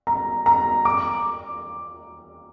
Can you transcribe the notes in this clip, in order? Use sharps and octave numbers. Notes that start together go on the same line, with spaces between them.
A#5
A#5
D6